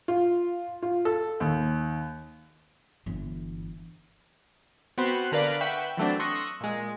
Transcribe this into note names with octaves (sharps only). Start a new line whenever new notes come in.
F4
F4
A4
D#2
G1 E3
B3 C4 F#4 B4 C5
D3 A#4 B4 D5 F5
B4 E5 F#5 G5 C#6
E3 F#3 A3 C4 D4
C6 C#6 D#6 E6 F#6 A#6
A#2 G#3